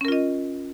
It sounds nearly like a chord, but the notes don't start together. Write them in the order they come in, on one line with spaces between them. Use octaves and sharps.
C#4 A#4 F4 D#5